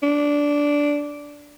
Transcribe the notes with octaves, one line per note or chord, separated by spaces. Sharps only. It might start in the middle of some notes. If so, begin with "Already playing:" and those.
D4